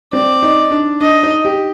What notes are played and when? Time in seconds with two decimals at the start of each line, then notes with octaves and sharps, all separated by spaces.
0.13 C4 D5
0.42 D#4
0.71 D4
1.01 D4 D#5
1.23 D#4
1.45 G4